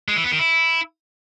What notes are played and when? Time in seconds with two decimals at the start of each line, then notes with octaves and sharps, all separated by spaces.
0.08 G#3
0.16 E3
0.24 B3
0.31 D#3
0.39 E4